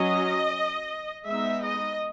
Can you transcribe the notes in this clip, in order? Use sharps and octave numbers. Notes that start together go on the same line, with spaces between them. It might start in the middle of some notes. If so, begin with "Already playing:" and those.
Already playing: F#3 C#4 D#5
G#3 B3 D#4 E5
D#5